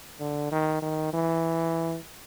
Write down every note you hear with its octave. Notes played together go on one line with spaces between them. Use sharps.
D3
D#3
D#3
E3